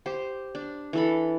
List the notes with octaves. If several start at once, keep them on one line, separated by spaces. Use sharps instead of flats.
G4 C5
D4
E3 A4 B5